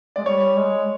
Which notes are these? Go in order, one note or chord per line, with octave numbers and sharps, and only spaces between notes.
G#3 D5
G3 C#5
G#3